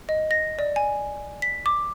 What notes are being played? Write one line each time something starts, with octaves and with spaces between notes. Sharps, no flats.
D#5
A#6
D5
G#5
B6
D6